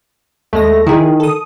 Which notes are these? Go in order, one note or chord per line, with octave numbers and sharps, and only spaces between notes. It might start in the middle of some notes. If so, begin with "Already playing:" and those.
D#2 G#3 A3 A#6
D#3 E4 G#4
A4 D#6